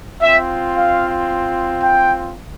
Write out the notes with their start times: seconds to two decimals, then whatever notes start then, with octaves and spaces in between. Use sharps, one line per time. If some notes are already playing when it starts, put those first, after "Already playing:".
0.21 C4 F4 E5
0.74 F5
1.81 G5